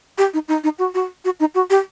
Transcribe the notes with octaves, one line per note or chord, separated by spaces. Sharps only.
G4
D#4
D#4
D#4
F#4
F#4
F#4
D#4
F#4
G4